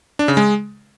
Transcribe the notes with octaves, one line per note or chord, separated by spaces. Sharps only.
D4
C#3
G#3